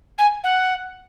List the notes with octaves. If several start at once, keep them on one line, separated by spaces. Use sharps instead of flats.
G#5
F#5